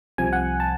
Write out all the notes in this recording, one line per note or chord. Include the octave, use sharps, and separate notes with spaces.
C2 C3 F3 G#5
F#5
A5